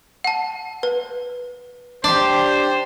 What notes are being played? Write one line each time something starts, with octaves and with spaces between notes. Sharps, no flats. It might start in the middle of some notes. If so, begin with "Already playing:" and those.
F#5 A5
B4
D4 G4 C5 D5